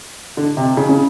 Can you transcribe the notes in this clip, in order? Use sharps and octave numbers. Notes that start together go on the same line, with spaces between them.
D3
C3
C#3
C#3